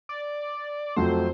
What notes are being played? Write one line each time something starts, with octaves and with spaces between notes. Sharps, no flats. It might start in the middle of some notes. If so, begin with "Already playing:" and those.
D5
F2 F#3 A3 C5